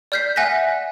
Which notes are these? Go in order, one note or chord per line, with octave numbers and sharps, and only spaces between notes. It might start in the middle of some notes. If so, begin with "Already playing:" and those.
D5 F6 G6 B6 C7
E5 F#5 G#5 F#6 A#6 B6